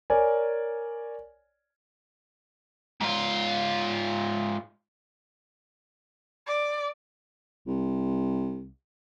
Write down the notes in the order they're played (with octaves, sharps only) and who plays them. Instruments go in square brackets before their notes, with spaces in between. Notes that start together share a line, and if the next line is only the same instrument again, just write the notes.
[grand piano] A#4 C#5 D5 G#5
[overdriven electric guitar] G#2 F4
[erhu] D5
[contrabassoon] C2